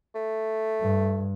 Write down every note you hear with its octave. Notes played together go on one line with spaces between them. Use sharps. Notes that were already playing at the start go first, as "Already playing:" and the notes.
A3
G2